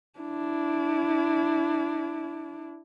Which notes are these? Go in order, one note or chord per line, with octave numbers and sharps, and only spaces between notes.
D4 E4